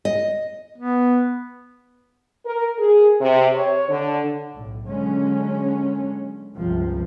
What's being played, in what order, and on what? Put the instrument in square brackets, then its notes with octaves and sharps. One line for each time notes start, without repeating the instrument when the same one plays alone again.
[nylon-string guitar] D#5
[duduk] B3
[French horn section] A#4
G#4
C3
C#5
D3
[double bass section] B1 A2
D3 F#3 G#3 A#3 C#4
G1 C#2 C3 F3